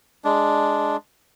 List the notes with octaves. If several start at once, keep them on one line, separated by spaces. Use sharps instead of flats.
G#3 D4